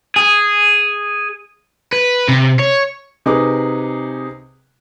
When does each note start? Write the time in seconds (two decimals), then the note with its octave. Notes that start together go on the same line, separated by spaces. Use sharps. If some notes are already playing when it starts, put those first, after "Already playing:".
0.16 G#4
1.93 B4
2.28 C3
2.59 C#5
3.26 C3 D#4 G#4 B4 D6